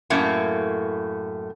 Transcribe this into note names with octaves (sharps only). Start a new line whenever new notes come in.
F#2 A2 A3 A#3